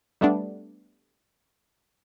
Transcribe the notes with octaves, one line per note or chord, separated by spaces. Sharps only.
G3 A3 B3 D4